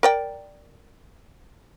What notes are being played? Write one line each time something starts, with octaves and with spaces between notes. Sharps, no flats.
A#4 D5 G5